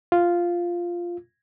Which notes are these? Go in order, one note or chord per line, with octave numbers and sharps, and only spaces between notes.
F4